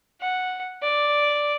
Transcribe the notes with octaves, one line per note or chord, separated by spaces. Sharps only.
F#5
D5